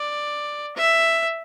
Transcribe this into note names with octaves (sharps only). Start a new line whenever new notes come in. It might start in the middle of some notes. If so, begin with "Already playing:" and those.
Already playing: D5
E5